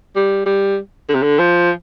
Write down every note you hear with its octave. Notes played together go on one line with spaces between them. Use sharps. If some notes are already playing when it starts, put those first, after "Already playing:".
G3
G3
D3
C3
D3
F3